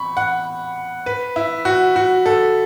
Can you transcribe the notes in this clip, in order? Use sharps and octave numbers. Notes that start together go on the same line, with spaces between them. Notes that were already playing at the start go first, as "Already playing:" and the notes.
Already playing: B5 C#6
F#5
B4
E4
F#4
F#4
A4